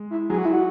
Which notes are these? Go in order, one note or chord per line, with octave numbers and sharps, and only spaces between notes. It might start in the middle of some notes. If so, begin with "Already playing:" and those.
Already playing: G#3
E4
F#3 G#4
F#4
E4
F#4